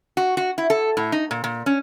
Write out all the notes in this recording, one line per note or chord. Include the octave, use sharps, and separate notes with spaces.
F#4
F#4
E4
A4
A2
D#4
A#2
A#2
C#4